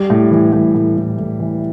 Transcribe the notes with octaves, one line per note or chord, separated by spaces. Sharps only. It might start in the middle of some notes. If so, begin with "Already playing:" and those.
Already playing: G3
A2
E3
A2
A2
A2
A2
E3